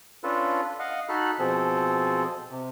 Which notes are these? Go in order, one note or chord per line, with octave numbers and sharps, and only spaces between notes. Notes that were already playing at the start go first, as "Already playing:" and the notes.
C#4 D4 F4 A4 B4
D#5 F5 F#5
D#4 F#4 A4 B5 F6 F#6
B2 F3 C4 G#4 A4
C3